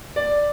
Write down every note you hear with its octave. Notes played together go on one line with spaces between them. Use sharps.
D5